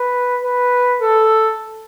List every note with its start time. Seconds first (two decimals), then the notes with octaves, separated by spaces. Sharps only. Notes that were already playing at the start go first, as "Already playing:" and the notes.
Already playing: B4
0.44 B4
1.02 A4